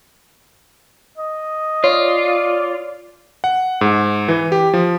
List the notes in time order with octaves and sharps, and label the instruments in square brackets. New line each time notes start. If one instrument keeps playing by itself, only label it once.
[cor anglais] D#5
[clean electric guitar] F4 [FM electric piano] C#5 [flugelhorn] D5
[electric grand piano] F#5
G#2
E3
G4
F3